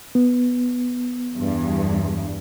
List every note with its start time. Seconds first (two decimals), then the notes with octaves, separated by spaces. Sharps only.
0.15 B3
1.37 E2 G2